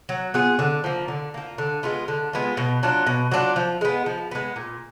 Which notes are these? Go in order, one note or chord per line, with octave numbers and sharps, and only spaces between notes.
F#3
B3 F4 G#4
D3
F3 A#3
D3
F3 A#3
D3
G#3 B3 F4
D3
G#3 B3 F4
B2
F#3 D4 F4
B2
F#3 D4 F4
F3
G#3 B3
F3
G#3 B3
A#2